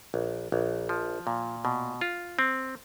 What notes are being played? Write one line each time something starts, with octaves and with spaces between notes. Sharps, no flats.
A#1
A#1
F3
A#2
B2
F4
C4